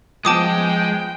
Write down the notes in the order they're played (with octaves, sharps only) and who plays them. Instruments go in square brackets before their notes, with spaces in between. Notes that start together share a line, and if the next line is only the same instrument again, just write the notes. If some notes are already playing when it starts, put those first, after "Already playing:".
[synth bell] F3 B3 [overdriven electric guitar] G#3 [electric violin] G5 [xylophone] A5 D6 D#6